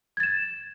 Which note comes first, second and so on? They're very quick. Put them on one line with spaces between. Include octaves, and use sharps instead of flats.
G#6 A6 E7